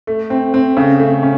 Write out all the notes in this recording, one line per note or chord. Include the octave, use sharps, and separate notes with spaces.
A3
C4
C4
C#3
A3
C#4